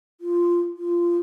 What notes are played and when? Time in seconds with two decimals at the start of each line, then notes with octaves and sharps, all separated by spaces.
0.21 F4
0.77 F4